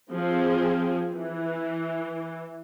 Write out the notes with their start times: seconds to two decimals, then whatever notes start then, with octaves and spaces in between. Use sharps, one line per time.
0.11 F3 C4 G#4
1.12 E3